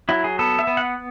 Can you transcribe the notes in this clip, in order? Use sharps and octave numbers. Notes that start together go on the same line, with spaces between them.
F#3 E4
G#4
B3 A4
E5
B3
F#5